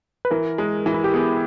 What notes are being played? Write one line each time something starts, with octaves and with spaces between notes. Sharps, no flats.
B4
E3 A#4
G#3
E3
E4
G4
B3 G#4